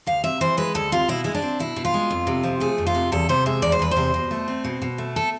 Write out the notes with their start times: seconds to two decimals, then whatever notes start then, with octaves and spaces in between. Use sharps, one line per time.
0.07 D2 F5
0.24 C3 E5
0.41 E3 C5
0.57 G#3 B4
0.74 D2 A4
0.92 C3 F4
1.08 B2 E4
1.24 G#3 E4
1.34 D4
1.42 C4
1.59 B2 E4
1.76 B2
1.85 F4
1.94 G#3
2.10 F2
2.27 C3
2.44 F3
2.60 A3 G#4
2.78 F2
2.86 F4
2.95 C3
3.12 E2 A4
3.29 C3 C5
3.46 G#3 E5
3.62 E2 D5
3.72 C5
3.79 E2 B4
3.91 C5
3.96 C3
4.14 B2
4.31 A3
4.48 C4
4.65 B2
4.82 B2
4.98 A3
5.16 A4